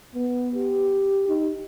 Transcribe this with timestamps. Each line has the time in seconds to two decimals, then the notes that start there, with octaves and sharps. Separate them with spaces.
0.15 B3
0.55 G4
1.29 D#4